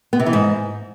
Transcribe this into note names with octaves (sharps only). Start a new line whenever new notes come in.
B3
C3
E3
G#2